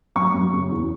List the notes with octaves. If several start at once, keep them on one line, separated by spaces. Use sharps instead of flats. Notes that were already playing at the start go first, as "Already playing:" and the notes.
F#2 C#6
F#2
C#3
E2